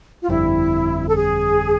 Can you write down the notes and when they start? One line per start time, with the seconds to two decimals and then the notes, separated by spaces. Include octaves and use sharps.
0.23 F4
0.28 G1 F2 D3 G3 C4 E4
1.08 A4
1.16 G#4